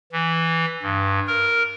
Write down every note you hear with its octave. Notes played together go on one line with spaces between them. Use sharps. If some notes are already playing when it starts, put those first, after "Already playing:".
E3
G2
A#4